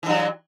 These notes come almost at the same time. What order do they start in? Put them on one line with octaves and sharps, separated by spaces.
E3 G2 F#3